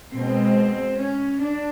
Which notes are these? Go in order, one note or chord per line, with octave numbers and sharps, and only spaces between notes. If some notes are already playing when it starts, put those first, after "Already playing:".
B2 G#3 C4
C#4
D4